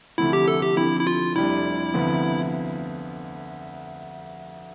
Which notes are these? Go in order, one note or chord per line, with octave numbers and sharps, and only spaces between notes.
D2 C3 F3 A3 E4
G4
A4
G4
D3 F3 C4 E4
E4
F4
F1 F2 C3 G3 D4 E4
D2 C3 F3 B3 F4